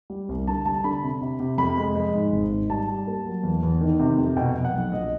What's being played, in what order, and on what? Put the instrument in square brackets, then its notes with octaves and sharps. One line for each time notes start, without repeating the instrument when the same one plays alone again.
[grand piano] G3
C2
D3 A5
G3 A5
D3 B5
C3
C3
C3
F2 B5
G#3
G#3
G#2
G#1
G#2
G3 A5
G3
A#3
F#3
E2
E2
D#3
C3
F2
B2 G5
B2
F#5
B1
A#1 D#5